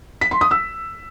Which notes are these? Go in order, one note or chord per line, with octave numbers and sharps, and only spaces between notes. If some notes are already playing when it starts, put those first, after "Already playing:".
B6
C6
D#6
E6